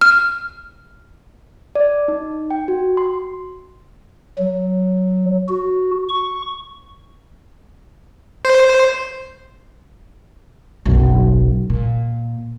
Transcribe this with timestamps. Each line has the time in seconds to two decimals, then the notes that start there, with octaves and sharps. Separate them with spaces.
0.01 F6
1.75 D5
2.08 D#4
2.51 G5
2.68 F#4
2.97 C6
4.39 F#3
5.49 F#4
6.09 C#6
8.45 C5
10.85 F#1 B1
11.70 A#2